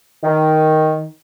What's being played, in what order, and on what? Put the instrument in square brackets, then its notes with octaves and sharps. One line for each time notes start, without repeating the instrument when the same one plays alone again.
[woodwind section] D#3